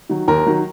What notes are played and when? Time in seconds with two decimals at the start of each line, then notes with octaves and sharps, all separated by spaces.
0.10 D#3 F#3
0.28 D#2 A#4
0.46 D#3 F#3